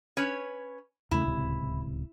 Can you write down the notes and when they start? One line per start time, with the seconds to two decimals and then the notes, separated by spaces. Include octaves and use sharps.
0.17 C#4 B4 C#5
1.11 E2 C#3 A3 E4
1.25 D1 C#2 C3